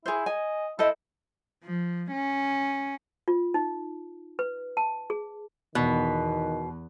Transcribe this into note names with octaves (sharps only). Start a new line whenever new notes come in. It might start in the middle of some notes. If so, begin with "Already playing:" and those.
E4 G#4 C5
D#5 G#5
E4 A4 C5 D#5
F3
C#4
F4
D#4
B4
A5
G#4
E2 B2 D#3